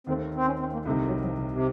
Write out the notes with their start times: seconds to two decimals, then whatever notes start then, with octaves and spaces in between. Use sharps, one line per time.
0.07 D#2 D#3 A3 C4
0.35 C4
0.46 C#4
0.59 C4
0.73 A#3
0.85 C2 C3 D#3 A3
1.06 F#3
1.20 F#3
1.25 F3
1.38 C#3
1.51 C3